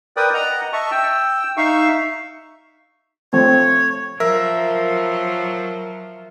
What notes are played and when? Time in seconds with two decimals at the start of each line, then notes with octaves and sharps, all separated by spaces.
0.17 A#4 B4 D5 G5 D#6
0.34 D#5 F#5 A#5
0.73 D#5 E5 A5 C#6
0.91 G5 E6
1.57 D#4 E5 F5 C#6 E6
3.33 F3 A3 C4 C#5
4.20 F3 F#3 A#4 E5